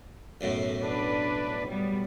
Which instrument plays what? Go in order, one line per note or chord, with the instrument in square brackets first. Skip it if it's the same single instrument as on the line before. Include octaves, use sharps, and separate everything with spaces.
[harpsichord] B1 F#2 A2
[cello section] D4 B4
G3 B3